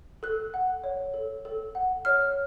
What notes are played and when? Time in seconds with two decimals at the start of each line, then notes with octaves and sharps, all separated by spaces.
0.23 A4 F#6
0.54 F#5
0.84 C#5
1.14 A4
1.45 A4
1.75 F#5
2.05 C#5 F6